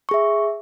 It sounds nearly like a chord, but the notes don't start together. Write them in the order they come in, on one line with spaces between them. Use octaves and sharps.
C#6 G#4 E5